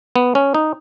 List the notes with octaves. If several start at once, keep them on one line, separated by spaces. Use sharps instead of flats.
B3
C#4
D#4